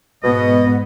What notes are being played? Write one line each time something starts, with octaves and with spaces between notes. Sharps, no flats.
G#2 B2 B3 D#5